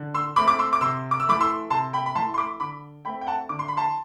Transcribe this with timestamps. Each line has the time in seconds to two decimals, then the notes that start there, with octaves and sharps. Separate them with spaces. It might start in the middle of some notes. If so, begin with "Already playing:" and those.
Already playing: D3
0.14 C6 E6
0.36 A3 C4 B5 D6
0.48 D6
0.59 C6 E6
0.73 D6
0.81 C3 C6 E6
1.11 D6
1.20 E6
1.26 E3 A3 B5 D6
1.40 C6 E6
1.70 C3 A5 C6
1.93 G5 B5
2.06 B5
2.15 E3 A5 C6
2.19 A3
2.34 C6
2.38 B5 D6
2.60 D3 B5 D6
3.05 A3 G5 B5
3.09 C4
3.21 G5
3.27 F#5 A5
3.49 D3 D6
3.59 C6
3.68 B5
3.77 A5 C6